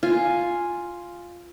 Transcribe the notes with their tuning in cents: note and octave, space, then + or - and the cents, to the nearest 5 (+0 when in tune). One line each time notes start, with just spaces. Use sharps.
F4 +0 G#5 +0